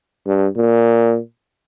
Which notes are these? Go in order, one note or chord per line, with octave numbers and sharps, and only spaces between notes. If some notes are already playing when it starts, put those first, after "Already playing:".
G2
A#2